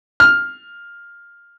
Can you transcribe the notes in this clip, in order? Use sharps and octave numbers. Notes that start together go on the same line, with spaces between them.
F6